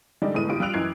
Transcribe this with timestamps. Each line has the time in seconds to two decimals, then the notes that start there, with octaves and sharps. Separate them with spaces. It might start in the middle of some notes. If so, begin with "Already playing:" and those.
0.22 D3 G3 G#3 D#4 A4 D5
0.34 G1 A2 G#3 B3 D#6 D#7
0.49 G1 A2 F4 G4 D7
0.60 G3 F4 E6 F#6 D7 F7
0.73 A1 F#2 E3 G#6 C7